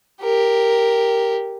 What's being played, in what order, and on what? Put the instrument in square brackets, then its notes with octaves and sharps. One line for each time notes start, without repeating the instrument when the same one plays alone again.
[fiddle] G4 A#4